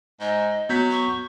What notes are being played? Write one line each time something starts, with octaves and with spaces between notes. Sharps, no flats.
G#2 D#5
F#3 B3 G6 B6
C#6